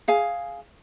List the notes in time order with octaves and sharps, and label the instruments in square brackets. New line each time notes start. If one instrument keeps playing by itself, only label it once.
[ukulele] G#4 F5 G#5